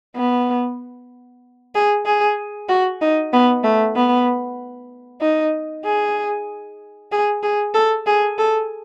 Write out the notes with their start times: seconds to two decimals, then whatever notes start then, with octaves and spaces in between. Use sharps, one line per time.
0.16 B3
1.75 G#4
2.05 G#4
2.68 F#4
3.01 D#4
3.33 B3
3.63 A3
3.96 B3
5.21 D#4
5.85 G#4
7.12 G#4
7.43 G#4
7.74 A4
8.06 G#4
8.38 A4